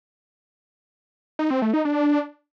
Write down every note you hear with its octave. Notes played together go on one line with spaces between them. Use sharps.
D#4
C4
A3
D#4
D4